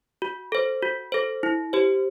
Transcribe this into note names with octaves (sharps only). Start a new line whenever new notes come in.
F#4
A4 C5
F#4
A4 C5
E4
G4 C5